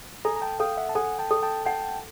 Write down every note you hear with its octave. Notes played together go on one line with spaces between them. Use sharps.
A4 G#5 A#5
A#5
G5 A5
A4 F5 G5
E5 F#5
A5
A4 F#5 G#5
G5 A5
A4
G5 A5
F#5 G5 A5